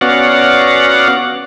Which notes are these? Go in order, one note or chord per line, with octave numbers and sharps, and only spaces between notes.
B3 C#4 F#4 D5 F5 F#5